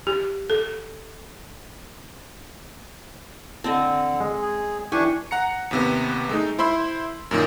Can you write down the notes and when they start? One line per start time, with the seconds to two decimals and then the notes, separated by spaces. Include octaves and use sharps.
0.07 G4
0.50 A4
3.64 D3 C4 D#5 A5
4.20 G#3
4.42 G#4
4.92 E3 D4 G4 G#5 C#6
5.31 F#5 A#5 C#7
5.71 D#2 C3 B3
6.29 G#3 A3 D#4
6.59 E4 C5 B5 C6 E6
7.31 F#2 A#2 D#3